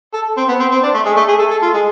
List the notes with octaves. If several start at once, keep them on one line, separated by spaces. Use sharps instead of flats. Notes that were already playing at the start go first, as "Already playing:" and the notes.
A4
C4
B3
C4
C4
D4
A3
G#3
A3
G#4
A4
A4
F4
G#3